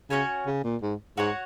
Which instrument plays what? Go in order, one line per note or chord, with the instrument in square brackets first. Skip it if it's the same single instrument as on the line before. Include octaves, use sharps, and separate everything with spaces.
[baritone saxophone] C#3 [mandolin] C#4 F#4 C#5 G#5
[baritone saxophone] C#3
A#2
G#2
[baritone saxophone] G#2 [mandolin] F#4 C#5 F#5